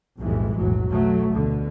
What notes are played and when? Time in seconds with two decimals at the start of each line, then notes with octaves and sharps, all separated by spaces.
0.19 B1 F2 A2 E3 G3 G#3
0.57 F1 B1 A2 F#3
0.89 B2 F#3 A3
1.30 D2 B2 D3